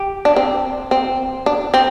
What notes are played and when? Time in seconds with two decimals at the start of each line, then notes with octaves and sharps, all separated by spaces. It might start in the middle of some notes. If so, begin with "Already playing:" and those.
Already playing: G4
0.25 D4
0.36 C4
0.91 C4
1.46 D4
1.74 C4